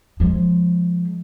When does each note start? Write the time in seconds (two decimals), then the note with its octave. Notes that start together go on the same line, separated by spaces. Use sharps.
0.20 F3 G#3